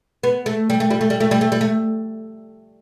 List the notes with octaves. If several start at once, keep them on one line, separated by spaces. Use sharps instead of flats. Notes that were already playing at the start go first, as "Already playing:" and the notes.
B3
A3
G3
A3
G3
A3
G3
A3
G3
A3
G3
A3